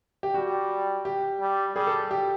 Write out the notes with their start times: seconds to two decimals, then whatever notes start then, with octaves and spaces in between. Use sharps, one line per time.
0.23 G4
0.34 G3 F#4
1.05 G4
1.40 G3
1.75 G3 G#4
1.87 A4
2.11 G4